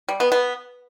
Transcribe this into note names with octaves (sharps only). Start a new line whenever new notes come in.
G3
B3
B3